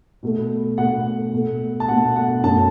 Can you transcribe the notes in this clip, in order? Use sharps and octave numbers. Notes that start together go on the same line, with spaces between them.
B2 A3
B2 A3 F#5
B2 A3
A5
B2 A3 F#5
F#5
F#2 F#3 A3 A5